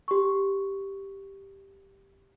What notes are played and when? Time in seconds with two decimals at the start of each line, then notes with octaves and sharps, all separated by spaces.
0.08 G4 C#6